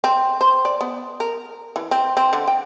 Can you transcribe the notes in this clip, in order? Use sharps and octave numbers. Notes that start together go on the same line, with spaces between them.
C4
C5
D5
B3
A#4
E3
C4
C4
D3
G5